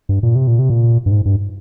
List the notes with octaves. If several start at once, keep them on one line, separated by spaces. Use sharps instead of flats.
G2
A#2
C3
A#2
C3
A#2
G2
G#2
G2